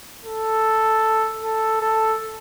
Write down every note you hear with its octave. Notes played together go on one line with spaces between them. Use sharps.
A4
A4
A4